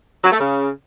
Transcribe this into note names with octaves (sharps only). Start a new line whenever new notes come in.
F#3
A3
C#3